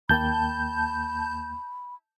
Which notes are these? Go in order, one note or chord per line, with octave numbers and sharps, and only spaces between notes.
D#2 A#3 G5 A5 B5 G6